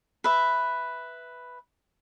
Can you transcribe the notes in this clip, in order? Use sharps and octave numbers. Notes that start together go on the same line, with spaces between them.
B4 E5